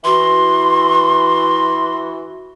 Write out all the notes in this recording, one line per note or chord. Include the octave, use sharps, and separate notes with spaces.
E3 F#4 C6